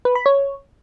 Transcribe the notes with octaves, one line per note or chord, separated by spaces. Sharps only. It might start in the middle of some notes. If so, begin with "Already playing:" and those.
B4
B5
C#5